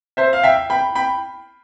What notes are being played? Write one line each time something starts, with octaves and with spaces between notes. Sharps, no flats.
C5 E5
F5
E5 G5
G5 B5
G5 B5